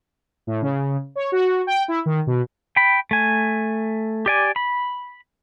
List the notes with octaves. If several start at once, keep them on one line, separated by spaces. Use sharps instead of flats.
A2
C#3
C#5
F#4
G5
E4
D#3
B2
G5 B5
A3 G#5
G4 D5 G#5
B5